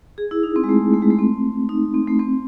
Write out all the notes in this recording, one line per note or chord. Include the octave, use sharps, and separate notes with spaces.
G#4
E4
D#4
C4
G#3
A3
A3
G#3
A3
C4
D#4
C4
A3
C4